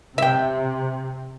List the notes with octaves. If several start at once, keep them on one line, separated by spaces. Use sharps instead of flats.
C3 E5 G5